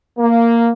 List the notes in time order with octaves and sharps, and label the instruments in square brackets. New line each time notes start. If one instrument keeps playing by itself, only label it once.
[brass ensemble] A#3